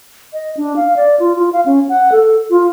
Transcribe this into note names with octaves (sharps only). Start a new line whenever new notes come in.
D#5
D4
F5
D5
F4
F4
F5
C#4
F#5
A4
F4